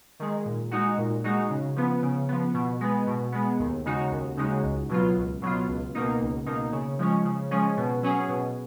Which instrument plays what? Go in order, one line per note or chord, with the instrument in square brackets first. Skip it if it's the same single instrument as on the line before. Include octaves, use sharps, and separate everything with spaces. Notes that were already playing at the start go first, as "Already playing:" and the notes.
[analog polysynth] D#3 G#3
A#2
G#3 D#4 F#4
A#2
G#3 D#4 F#4
C#3
F3 B3
C#3
F3 B3
B2
G#3 B3
B2
G#3 B3
D#2
C#3 G#3 D#4 F#4
D#2
C#3 G#3 D#4 F#4
C#2
B2 F#3 B3 F4
C#2
B2 F#3 B3 F4
C#2
B2 A#3 D#4
C#2
B2 A#3 D#4
C#3
F3 G#3 C#4
C#3
F3 G#3 C#4
B2
F#3 C#4 G#4
B2